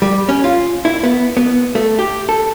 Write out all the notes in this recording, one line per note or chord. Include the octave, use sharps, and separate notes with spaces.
G3
C#4
F4
E4
B3
B3
A3
G4
A4